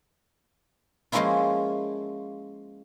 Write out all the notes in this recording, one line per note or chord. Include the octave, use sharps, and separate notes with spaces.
F3 G#3 A#3 C#4 E4 F4